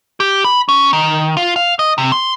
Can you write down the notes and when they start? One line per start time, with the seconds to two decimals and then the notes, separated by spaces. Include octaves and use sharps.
0.20 G4
0.44 B5
0.69 C#4
0.93 D#3
1.37 F4
1.56 F5
1.79 D#5
1.98 C3
2.12 C6